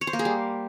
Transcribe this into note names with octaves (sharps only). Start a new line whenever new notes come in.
C#5
C5
A#3
G#4
G3